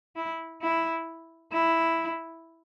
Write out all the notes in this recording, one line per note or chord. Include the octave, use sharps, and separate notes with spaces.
E4
E4
E4